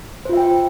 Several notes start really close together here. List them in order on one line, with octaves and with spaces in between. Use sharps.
C5 F4 E5 G5